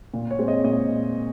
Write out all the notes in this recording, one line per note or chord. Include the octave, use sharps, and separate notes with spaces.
A#2
C#5
G#3 C4
D#5
A#2 D#5